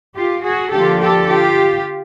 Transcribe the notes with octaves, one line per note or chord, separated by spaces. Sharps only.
F4 G4
F#4 G#4
D3 F3 A#3 D4 F4 G4 A4
G4 A4
F4 G4